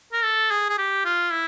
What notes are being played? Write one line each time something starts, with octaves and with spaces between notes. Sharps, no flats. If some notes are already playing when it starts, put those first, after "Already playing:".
A#4
A4
G#4
G#4
G4
F4
E4